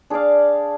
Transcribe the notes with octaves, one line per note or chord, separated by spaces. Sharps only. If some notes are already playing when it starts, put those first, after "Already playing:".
D4 G#4 D5 F5